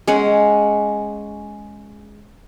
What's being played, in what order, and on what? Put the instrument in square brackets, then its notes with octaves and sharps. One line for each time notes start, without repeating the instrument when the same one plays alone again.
[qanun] G#3 C#4 F#5